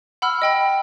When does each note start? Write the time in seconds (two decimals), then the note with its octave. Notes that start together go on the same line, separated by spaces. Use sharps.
0.22 F#5 B5 E6 F6
0.42 D#5 G5 B5